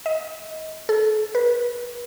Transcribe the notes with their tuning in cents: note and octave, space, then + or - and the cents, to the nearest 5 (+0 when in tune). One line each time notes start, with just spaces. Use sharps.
D#5 +25
A4 -40
B4 -40